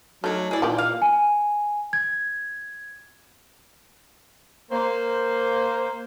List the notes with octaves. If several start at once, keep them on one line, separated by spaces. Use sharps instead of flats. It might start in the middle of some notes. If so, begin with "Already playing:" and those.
D#3 F#3 A3 D4 A4
E4 G#4 D5
A#2 D#3 E3 G4
F5
G#5
G#6
A#3 C5